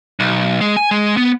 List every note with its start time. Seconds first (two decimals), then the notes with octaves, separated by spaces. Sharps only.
0.20 B1
0.61 G#3
0.77 G#5
0.91 G#3
1.17 B3